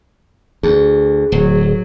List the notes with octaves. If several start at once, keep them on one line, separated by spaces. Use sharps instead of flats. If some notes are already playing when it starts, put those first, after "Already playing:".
D2 G#4
D1 F#3